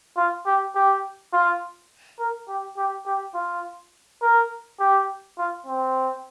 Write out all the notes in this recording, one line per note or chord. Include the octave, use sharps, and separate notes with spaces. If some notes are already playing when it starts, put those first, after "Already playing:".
F4
G4
G4
F4
A#4
G4
G4
G4
F4
A#4
G4
F4
C4